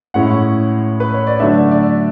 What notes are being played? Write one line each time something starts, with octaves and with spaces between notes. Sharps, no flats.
A2 G#3 C#4 E4 F#5
B4
C#5
D5
D3 F#3 A3 D4 E5
D5